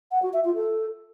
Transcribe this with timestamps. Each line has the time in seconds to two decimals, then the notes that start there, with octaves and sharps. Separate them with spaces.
0.11 F#5
0.22 F#4
0.33 E5
0.44 F4
0.55 A4